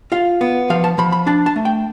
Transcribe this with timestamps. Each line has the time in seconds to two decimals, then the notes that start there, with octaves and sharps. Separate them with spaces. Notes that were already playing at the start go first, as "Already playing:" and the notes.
0.12 F4 F5
0.41 B3
0.70 F3 F5
0.84 A5
0.98 F3 B5
1.12 B5
1.27 D4 A5
1.46 A5
1.56 A3
1.65 G5